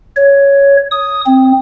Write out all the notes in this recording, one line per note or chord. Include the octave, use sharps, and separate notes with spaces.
C#5
D#6
C4